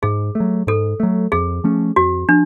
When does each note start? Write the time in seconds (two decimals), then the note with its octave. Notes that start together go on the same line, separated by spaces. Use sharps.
0.03 G#2 G#4
0.35 A3
0.40 F#3
0.67 G#2 A4
1.00 F#3 A3
1.32 F2 G#4
1.64 F3 A3 C#4
1.96 F2 F#4
2.29 F3 D4